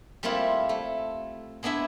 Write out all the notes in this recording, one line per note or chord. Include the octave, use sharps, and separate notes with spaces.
G3 A3 A#3 C4 E4 F4
A3
G#3 B3 D4 E4 E5